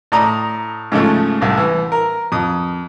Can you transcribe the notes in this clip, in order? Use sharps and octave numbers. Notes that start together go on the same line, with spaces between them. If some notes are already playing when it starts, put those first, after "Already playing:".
A2 D5 A#5 D#6
G#2 C#3 F3 A3
C2 A2
E3
A#4
F2 D#6